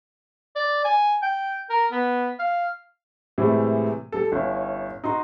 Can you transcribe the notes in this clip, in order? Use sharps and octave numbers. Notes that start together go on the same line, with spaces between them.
D5
G#5
G5
A#4
B3
F5
A2 C3 E3 G3 G#3
G3 A4
G1 C#4 E4
D#4 F#4 C6